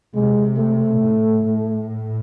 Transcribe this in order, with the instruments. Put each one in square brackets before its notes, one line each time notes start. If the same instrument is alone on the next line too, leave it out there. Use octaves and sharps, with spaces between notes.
[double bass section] C3 [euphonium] G#3
[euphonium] A3
[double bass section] A2
A2